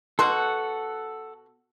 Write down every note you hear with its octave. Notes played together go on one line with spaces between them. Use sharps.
B2 F#4 A4 F#5 C6